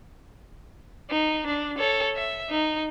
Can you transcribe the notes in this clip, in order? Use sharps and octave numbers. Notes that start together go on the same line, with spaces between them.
D#4
D4
A4 C#5
E5
D#4